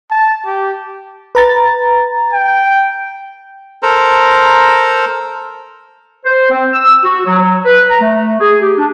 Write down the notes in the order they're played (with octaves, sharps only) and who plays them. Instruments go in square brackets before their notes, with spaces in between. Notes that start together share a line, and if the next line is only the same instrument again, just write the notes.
[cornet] A5
G4
[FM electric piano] B4 A#5 A6
[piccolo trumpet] G5
[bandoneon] A4 A#4 C5 A#5
[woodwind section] C5
C4
E6
F#4
F#3
F#3
B4
A#5
A3
G#4
G4
D4